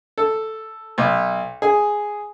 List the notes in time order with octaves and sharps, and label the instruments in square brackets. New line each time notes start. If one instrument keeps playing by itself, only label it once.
[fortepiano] A4
B1
G#4